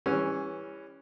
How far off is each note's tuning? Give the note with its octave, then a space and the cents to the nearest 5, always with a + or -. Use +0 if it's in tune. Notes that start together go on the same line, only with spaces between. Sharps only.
E3 +0 G3 +30 C#4 +0